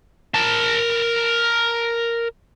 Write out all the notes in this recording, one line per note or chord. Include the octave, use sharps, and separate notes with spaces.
A#4 A5